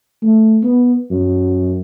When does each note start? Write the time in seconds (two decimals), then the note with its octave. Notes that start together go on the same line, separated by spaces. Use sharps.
0.22 A3
0.63 B3
1.11 F#2